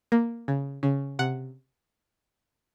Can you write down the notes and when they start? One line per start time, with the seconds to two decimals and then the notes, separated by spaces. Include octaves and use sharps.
0.12 A#3
0.48 C#3
0.83 C#3
1.19 C3 F#5